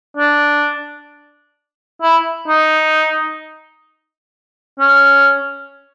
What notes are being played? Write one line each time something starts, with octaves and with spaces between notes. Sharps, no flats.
D4
E4
D#4
C#4